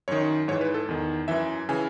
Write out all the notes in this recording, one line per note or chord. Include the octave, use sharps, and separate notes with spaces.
F#2 D#3 C#5
G#2 E3 C#5
B4
A4
E2 D#3
F#2 E3 E5
C#3 E3 G#5